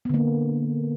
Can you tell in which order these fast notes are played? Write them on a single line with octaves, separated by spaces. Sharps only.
B3 D3 A#3